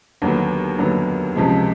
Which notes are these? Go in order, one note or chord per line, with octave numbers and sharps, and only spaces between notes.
D#2 D3 F#3 B3
D#2 D3 F#3 B3
C#2 C3 F3 G#3